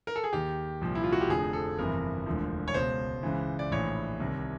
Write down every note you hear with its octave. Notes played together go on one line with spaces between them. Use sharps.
A#4
A4
G#4
D#2 D#3 G4
C2 A#2 F3
E4
F4
F#4
G4
F1 F2 D3 F3 G#4
A4
G1 F2 C3 E3 A#4
E1 D2 D3 F3
C#5
C#2 B2 C5
C#2 C#3 E3
D5
A#1 A2 E3 C#5
C2 C3 D#3